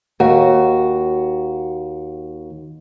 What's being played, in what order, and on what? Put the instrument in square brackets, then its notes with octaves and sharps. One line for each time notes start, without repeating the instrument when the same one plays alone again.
[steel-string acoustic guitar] D#2 F#4